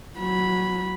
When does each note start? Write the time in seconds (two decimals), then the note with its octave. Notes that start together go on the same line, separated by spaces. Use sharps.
0.19 F#3 B5